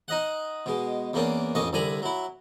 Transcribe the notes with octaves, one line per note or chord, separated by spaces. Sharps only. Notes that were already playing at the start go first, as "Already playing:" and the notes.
D#4 D#5 F#5
B2 G#3
E2 A#3 C#4 D4
A1 F2 C#4 D#5 C#6 D6
C2 D3 G#5 A#5 B5
F#3 E4